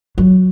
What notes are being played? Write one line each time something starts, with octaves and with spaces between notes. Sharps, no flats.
F#3